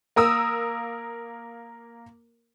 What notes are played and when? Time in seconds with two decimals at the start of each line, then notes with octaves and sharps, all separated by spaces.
0.16 A#3 A#4 D#6 E6